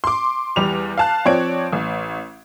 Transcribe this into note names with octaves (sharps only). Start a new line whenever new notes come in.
C6 D6
E2 G3 F7
F5 A5 F#6
F3 C4 C#5 D5 G#6 D7
A1